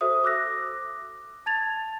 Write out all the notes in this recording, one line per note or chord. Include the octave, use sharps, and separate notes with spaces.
F#4 A4 C5 E5 D#6
D6 E6 F#6 A#6
A5 G#6 A6 F7